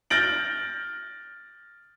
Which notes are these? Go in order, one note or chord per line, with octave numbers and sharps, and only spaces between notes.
F6 G6 A6 A#6 D7 F#7